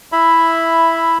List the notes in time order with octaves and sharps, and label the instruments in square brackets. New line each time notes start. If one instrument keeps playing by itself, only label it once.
[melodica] E4 E5 B5